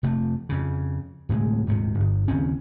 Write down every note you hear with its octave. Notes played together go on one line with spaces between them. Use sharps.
F1 C3 A3
F2 C#3
D1 A2 C3 G#3
D#1 G#2 C3
G1
F#1 D#2 C4 C#4